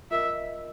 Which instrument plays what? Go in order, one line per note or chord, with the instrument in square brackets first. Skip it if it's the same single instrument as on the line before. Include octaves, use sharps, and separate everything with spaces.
[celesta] F4 A#4 D#5 [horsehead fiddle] E5